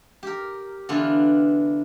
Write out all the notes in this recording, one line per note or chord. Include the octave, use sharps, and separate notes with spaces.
G4 A#4
D3 E3 B3 F4